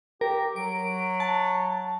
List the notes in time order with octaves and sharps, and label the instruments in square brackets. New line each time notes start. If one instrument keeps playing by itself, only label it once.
[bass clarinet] G4 [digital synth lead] A#4
[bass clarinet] F#3 [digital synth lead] D7
[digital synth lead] A5